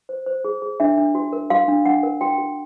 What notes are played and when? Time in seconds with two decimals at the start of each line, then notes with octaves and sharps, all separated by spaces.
0.09 C5
0.26 C5
0.45 G#4
0.62 G#4
0.80 D4 E5
0.97 D4
1.15 F#4
1.33 A#4
1.50 F#4 F5
1.68 D4
1.85 D4 F#5
2.03 A#4
2.21 F#4 G5
2.38 F#4